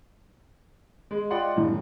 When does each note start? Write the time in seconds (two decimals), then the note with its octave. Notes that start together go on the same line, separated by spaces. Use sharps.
1.11 G#3
1.30 F4 D5 D#5 F#5 G5 C6
1.56 C2 F#2 A2 D3